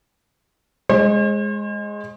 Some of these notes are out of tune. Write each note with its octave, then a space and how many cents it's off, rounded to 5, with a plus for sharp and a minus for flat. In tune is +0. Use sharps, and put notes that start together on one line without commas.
G#3 +0 C5 +45